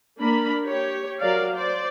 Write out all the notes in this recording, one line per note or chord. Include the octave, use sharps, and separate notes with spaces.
A#3 D4 A#4 B5
G4 C#5
F#3 A#4 D5 F5
C5 D5